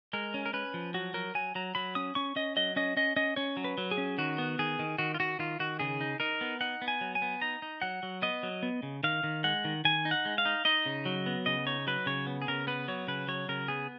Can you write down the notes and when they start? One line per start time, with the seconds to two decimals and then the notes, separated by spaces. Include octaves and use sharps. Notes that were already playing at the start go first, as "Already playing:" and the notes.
0.13 G#3 A#4
0.34 C#4
0.46 A#4
0.53 C#4 B4
0.74 F3
0.94 F#3 F#4
1.14 F#3 A#4
1.35 F#3 G#5
1.55 F#3 A#5
1.75 F#3 B5
1.95 C#4 D#6
2.15 C#4 C#6
2.36 C#4 D#5
2.56 F#3 D#5
2.76 C#4 D#5
2.97 C#4 D#5
3.16 C#4 D#5
3.36 C#4 C#5
3.57 F#3
3.64 B4
3.78 F#3
3.91 G#4
3.98 C#4
4.18 D#3 F#4
4.38 B3
4.59 D#3 G#4
4.79 D#3
4.98 D#3 F#4
5.14 F4
5.20 D#3 F#4
5.39 D#3 F4
5.60 D#3 F#4
5.79 C#3 G#4
6.01 D#4
6.20 D#4 A#4
6.41 B3
6.61 D#4 F#5
6.82 B3
6.88 G#5
7.01 F#3
7.15 G#5
7.22 B3
7.41 D#4 A#5
7.62 D#4
7.82 F#3 F#5
8.03 F#3
8.22 B3 D#5
8.43 F#3
8.63 B3
8.83 C#3
9.03 D#3 F5
9.24 D#3
9.44 G#3 F#5
9.65 D#3
9.85 D#3 G#5
10.05 D#4
10.11 F#5
10.25 G#3
10.38 F5
10.45 D#4
10.65 D#4 D#5
10.86 C#3
11.06 F#3
11.26 B3
11.46 C#3 D#5
11.66 D#4 C#5
11.87 F#3 B4
12.06 C#3 C#5
12.27 B3
12.42 G#4
12.48 C#3 A#4
12.67 B3 B4
12.88 F#3 C#5
13.08 C#3 B4
13.28 F#3 C#5
13.49 C#3 A#4
13.68 B3 G#4